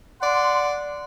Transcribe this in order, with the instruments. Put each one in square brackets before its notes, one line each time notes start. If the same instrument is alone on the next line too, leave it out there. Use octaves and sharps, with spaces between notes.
[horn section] D5 F#5 C6